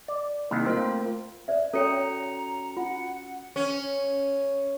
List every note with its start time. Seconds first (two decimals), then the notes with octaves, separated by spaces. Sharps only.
0.08 D5
0.51 C2 D#3 A#3
0.66 A3 C4 F4 F5
1.48 C5 D5 E5
1.74 C#4 F#4 A4 C#5 G5 A#5 C#7
2.77 F4 F#5
3.56 C#4